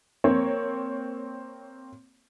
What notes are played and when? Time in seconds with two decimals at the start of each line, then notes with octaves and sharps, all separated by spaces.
0.24 A#3 C4 C#5